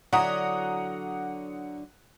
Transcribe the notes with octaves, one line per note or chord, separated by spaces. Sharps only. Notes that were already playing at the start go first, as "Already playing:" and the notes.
D3 F#3 E4 F#5 A#5 D#6